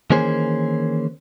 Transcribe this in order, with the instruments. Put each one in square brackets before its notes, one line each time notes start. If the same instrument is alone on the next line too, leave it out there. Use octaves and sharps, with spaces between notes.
[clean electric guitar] D#3 E3 A#3 C#4 G#4 C5